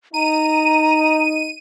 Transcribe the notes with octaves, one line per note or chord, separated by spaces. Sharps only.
D#4 A#5 D#7